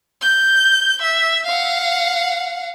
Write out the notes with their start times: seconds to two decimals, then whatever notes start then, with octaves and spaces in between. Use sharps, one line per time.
0.22 G6
1.01 E5
1.46 F5 F#5